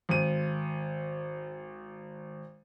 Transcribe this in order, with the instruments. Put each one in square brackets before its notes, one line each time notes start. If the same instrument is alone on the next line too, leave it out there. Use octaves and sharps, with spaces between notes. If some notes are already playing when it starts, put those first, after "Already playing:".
[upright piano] G#1 D#7